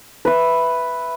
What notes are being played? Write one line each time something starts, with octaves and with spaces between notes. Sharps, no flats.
B4 E5